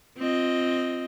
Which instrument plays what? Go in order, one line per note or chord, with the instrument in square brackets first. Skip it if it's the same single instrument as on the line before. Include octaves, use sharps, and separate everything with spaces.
[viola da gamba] C4 F4 D#5